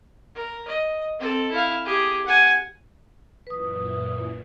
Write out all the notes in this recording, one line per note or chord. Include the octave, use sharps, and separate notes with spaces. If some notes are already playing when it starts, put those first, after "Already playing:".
A#4
D#5
C4 A4
E4 F5
G4 G#4
F#5 G#5
F#2 A#2 E3 B4 D#6